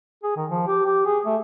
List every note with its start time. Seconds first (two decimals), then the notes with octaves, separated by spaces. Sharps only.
0.23 G#4
0.36 D#3
0.50 F3
0.67 G4
0.85 G4
1.05 G#4
1.25 A3